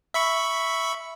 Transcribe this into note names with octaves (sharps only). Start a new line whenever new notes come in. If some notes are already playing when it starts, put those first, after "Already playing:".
E5 B5 C#6